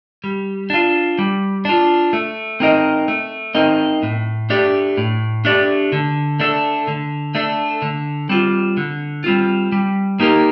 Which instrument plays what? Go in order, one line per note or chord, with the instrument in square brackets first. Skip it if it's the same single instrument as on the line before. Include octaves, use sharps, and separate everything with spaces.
[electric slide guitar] G3
D4 F4
G3
D4 F4
A3
C4 D#4 A#4 D#5
A3
C4 D#4 A#4 D#5
A2
A3 D4 G4 D5
A2
A3 D4 G4 D5
D3
A3 D4 A4
D3
A3 D4 A4
D3
G3 C4 F4
D3
G3 C4 F4
G3
A#3 D#4 G4 A#4